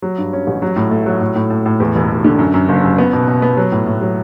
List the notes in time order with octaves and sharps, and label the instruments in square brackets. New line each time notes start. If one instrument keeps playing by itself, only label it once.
[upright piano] F#3
G2
C#4
A1
F#3
A2
A3
F#3
A2
A2
A2
A2
E2
E1
E1
D3
F#2
F#2
F#1
F#2
B3
B2
B2
B3
F#3
A2
A2
F#3